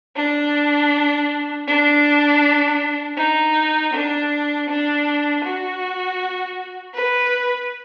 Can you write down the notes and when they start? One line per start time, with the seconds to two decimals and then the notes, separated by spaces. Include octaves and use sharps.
0.17 D4
1.68 D4
3.18 D#4
3.93 D4
4.69 D4
5.44 F#4
6.94 B4